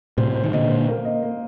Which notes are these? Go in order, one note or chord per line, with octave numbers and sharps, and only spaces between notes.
A2 C3 C5
C5
D#3
A#2 D3 D#5
C5
A#3
D#5
A#3